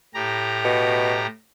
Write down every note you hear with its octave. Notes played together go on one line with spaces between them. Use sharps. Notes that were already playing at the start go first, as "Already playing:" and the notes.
A2 G4 A#5
B2